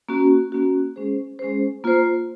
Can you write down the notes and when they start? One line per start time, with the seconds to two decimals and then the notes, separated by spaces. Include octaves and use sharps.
0.09 A#3 C#4 F#4
0.52 A#3 C#4 F#4
0.96 G#3 C#4 G#4 C5
1.39 G#3 C#4 G#4 C5
1.84 A#3 F4 C5